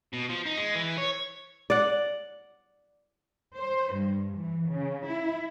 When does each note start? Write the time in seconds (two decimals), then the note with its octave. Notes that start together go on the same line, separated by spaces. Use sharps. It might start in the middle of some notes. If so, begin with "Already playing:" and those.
0.13 B2
0.29 F3
0.46 D#4
0.57 G#3
0.74 E3
0.97 C#5
1.70 D5 F#5
3.56 C5
3.93 G2
4.38 E3
4.70 C#3
5.07 E4